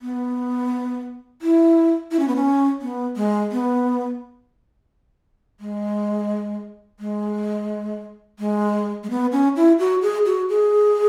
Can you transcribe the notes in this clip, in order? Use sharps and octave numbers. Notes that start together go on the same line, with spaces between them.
B3
E4
E4
C#4
B3
C#4
B3
G#3
B3
G#3
G#3
G#3
G#3
B3
C#4
E4
F#4
G#4
F#4
G#4